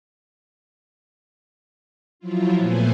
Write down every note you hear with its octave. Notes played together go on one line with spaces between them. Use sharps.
F3 F#3 E4 F4
A#2 A3 B3 B4 C5 G#5